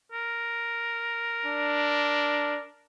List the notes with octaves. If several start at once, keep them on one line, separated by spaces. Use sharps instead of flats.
A#4
D4